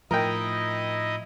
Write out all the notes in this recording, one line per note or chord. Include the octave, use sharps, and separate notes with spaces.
A2 F3 D#4 E4 A#4 D#5 G5